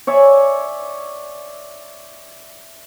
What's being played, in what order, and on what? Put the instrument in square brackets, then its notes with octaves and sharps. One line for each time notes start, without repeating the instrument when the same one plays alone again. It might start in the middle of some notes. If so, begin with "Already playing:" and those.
[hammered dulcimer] C#5 D5 E5 G#5